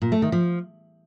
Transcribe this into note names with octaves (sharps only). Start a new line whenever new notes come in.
A#2
A3
D#3
F3